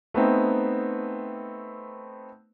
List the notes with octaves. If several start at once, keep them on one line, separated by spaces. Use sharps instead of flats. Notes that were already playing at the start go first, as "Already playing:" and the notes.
A3 B3 C4 D#4